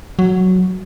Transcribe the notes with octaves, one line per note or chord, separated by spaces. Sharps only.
F#3